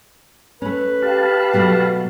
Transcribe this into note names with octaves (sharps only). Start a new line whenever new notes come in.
A3 C#4 B4
G4 F5 A5
B2 F#3 A3